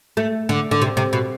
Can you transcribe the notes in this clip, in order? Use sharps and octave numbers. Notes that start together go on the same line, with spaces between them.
A3
D3
D3
C3
C3
B2